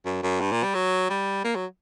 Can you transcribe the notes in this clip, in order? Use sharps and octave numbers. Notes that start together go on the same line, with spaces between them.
F#2
F#2
G2
A#2
G3
F#3
G3
A#3
F#3